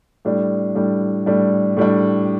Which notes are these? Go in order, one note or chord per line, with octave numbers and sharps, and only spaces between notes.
A2 G3 D4
A2 G3 D4
A2 G3 D4
A2 G3 D4